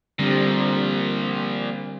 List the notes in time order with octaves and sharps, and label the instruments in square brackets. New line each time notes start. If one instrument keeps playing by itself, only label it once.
[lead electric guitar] A#2 F3 [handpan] D3 G3 C4